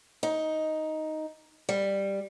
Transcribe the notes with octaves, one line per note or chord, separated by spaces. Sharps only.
D#4
G3